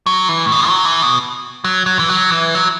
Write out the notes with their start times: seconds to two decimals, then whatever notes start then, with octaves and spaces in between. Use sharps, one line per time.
0.06 F#3
0.29 E3
0.46 A2
0.52 B2
0.68 F#3
0.85 E3
1.02 B2
1.64 F#3
1.86 F#3
1.99 E3
2.09 F#3
2.32 E3
2.55 F#3